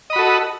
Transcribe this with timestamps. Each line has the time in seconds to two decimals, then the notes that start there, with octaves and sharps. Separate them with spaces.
0.10 D#5
0.13 B5
0.16 F#4
0.19 A4